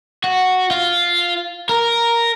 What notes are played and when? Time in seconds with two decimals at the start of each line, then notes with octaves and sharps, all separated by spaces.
0.24 F#4
0.71 F4
1.69 A#4